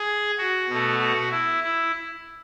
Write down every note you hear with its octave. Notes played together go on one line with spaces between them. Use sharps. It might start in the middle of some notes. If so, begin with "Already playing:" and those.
Already playing: G#4
F#4
B2 A3
F#4
E4
E4